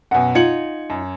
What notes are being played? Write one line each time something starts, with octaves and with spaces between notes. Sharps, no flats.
F#2 B2 F#5 G#5
D#4 F4 G#6 C#7 F#7
F#2